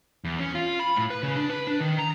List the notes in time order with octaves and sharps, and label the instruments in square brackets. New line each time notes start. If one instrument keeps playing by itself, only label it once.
[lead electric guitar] E2
C#4
F4
B5
A2
B4
C#3
D4
B4
D4
D#3
A#5